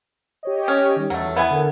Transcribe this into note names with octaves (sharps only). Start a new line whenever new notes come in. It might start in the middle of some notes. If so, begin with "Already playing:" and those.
G4 C#5 D#5
C#4
D#3 G3
E2 F#3 A3
B3 E4 G#5
D3 A4 A#4